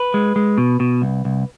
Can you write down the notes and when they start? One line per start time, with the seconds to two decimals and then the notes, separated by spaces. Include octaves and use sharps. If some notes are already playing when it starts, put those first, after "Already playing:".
Already playing: B4
0.14 G#3
0.36 G#3
0.58 B2
0.80 B2
1.02 C2
1.25 C2